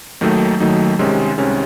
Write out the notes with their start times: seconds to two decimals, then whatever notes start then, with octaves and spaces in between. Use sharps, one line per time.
0.21 D#2 D#3 F#3 A3 D#4
0.60 D#2 D#3 F#3 A3 D#4
0.99 C2 C3 D#3 G#3 C#4
1.38 C2 C3 D#3 G#3 C#4